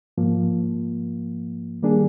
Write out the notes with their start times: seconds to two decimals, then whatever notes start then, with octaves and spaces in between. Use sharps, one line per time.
0.18 G#2 F3 A#3
1.82 D#3 G3 A#3 D4 G#4